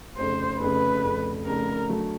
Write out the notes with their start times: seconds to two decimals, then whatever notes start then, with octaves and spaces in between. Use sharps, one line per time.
0.17 F1 F2 C#3 C5
0.60 F1 F2 C#3 B4
1.04 F1 F2 C#3
1.47 F1 F2 C#3 A#4
1.89 D3 F#3 A3